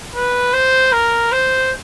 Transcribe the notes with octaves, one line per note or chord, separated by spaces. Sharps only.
B4
C5
A#4
C5